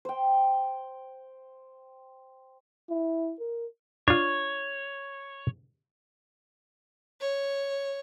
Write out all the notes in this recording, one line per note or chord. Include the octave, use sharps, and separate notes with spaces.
C5 G5
E4
A#4
D4 F4 C#5
C#5